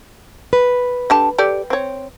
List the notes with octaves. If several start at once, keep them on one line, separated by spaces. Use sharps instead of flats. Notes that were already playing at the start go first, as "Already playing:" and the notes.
B4
D3 G4 A5
G4 A4 D5
C4 C#5